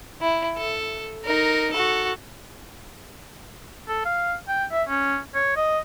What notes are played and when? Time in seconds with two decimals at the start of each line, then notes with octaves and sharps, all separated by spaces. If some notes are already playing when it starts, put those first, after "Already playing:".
0.21 E4
0.57 A4
1.25 D#4 A#4
1.73 F#4 A4
3.89 A4
4.05 F5
4.48 G5
4.72 E5
4.88 C#4
5.35 C#5
5.57 D#5